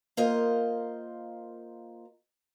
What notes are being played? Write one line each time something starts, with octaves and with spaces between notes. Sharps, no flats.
A#3 F4 A#4 C5 D#5